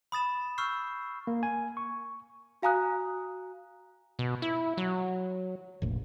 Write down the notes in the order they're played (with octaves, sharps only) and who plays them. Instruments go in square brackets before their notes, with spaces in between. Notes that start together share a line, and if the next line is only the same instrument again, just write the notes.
[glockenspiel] B5 D#6 A6 E7
C#6 E6 F6 G6 C7
[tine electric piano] A#3
G#5
C#6
[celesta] F#4 F5 G#5 A#5 D#6 F#6
[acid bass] B2
E4
F#3
[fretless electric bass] F1 A#1